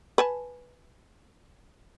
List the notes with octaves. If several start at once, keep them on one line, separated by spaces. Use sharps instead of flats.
B4 G#5 A5